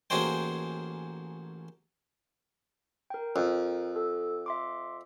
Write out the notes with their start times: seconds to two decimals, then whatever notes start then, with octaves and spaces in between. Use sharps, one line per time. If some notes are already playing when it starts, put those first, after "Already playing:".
0.10 A1 A#3 F#4 G#4 C5 G5
3.10 A#4 G5
3.36 F2
3.96 A4
4.46 E5 C6 D6